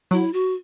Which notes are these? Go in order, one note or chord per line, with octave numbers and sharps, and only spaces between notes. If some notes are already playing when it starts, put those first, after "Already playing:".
F#3 E4
F#4